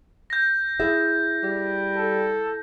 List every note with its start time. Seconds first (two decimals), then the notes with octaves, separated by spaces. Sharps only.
0.30 G6 A#6
0.80 E4 G#4 E5
1.43 G3
1.95 A4